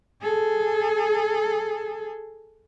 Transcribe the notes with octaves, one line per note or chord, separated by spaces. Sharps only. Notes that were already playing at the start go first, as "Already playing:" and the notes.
G#4 A4